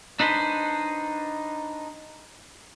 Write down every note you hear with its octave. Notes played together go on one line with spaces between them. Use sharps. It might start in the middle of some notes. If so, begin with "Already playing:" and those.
D4 D#4 B4 C5